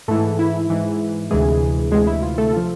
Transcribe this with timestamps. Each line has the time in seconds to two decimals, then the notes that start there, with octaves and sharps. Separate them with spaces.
0.08 G#2 E3 A3 A4
0.39 E4
0.70 G#2 E3
1.31 D2 C3 E3 G#3 G#4
1.91 D2 C3 E3 G#3 G#4
2.07 E4
2.22 F4
2.38 A3 A4
2.53 F3 F4